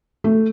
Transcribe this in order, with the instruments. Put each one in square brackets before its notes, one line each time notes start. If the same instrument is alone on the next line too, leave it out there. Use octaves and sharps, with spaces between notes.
[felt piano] A3